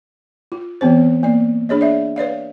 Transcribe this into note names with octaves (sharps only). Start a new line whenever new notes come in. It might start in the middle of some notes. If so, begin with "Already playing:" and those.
F4
E3 B3 C4 C5
A#3 D5
D4 G#4 C#5 D#5
D5 E5
B4 C#5 D5 F5